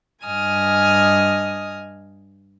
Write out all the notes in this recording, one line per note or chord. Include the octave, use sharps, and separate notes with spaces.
G2 D#5 G#5 D#6 F6